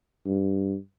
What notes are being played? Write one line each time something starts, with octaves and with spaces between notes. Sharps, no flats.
G2